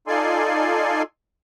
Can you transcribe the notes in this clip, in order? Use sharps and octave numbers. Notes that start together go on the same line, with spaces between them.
D#4 F4 A4 D5 G#5 C6